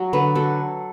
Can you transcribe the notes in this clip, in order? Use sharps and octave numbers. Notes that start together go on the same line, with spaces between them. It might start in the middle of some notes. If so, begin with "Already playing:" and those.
Already playing: F#3
D3 B4
F#3 A4